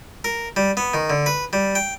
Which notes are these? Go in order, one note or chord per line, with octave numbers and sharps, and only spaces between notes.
A#4
G3
B3
D#3
D3
B4
G3
G5